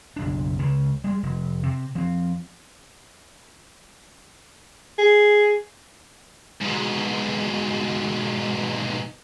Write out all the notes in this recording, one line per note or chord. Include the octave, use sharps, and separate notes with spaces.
F#1 B1 D4
C#2 C#3
G3 G#3
F1
C3
F3 C4
G#4
G#2 B2